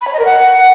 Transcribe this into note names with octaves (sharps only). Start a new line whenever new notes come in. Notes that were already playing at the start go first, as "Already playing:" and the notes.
B5
C#5
D#5
A#4
F#5